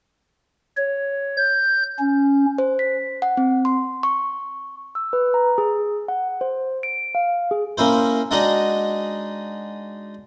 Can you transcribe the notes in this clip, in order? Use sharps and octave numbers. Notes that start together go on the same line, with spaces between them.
C#5
G6
C#4
C5
B6
F#5
C4
C6
C#6
E6
B4
A#5
G#4
F#5
C5
D7
F5
G#4
A#3 C#4 E4 C5
G#3 D4 D#4 F#4 G#4